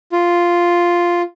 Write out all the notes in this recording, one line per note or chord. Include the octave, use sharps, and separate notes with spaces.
F4